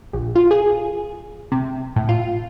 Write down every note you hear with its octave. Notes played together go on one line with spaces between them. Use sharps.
A#1
F4
G#4
C3
A2
F4